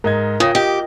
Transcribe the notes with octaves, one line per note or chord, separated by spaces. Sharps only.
G#2 A#4 D#5 G#6
C#3 F4 G5 D#6 A#6
G4 D#5 F5